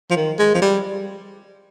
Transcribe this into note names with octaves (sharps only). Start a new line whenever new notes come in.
F3
D#3
G#3
F3
G3